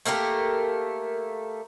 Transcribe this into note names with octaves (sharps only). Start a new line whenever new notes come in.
A3 A#3 G4 A#4